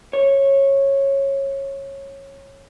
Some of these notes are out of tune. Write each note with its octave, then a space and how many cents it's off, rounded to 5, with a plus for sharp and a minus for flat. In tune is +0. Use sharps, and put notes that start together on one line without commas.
C#5 -15